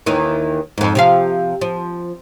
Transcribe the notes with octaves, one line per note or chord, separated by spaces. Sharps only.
D#2 D#3 E3
F2 G#2
C3 F3 F5
F3